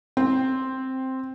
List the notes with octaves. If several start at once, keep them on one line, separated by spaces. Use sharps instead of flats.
C4